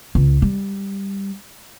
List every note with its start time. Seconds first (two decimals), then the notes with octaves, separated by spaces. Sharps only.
0.15 C#2
0.42 G3